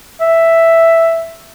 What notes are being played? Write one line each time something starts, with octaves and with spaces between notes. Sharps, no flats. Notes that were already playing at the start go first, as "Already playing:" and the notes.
E5